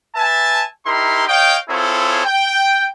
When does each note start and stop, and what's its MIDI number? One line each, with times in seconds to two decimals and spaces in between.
0.16 0.64 71
0.16 0.64 76
0.16 0.64 80
0.16 0.64 81
0.85 1.28 63
0.85 1.28 64
0.85 1.28 67
0.85 1.28 70
0.85 1.28 84
1.28 1.57 73
1.28 1.57 75
1.28 1.57 77
1.28 1.57 79
1.70 2.24 60
1.70 2.24 64
1.70 2.24 65
1.70 2.24 68
1.70 2.24 69
1.70 2.24 73
2.25 2.88 79